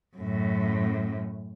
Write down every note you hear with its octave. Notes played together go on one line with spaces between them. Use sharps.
F#2 A2